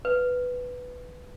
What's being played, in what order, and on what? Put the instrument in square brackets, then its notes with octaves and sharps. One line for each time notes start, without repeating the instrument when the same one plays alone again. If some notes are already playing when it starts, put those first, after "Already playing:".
[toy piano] B4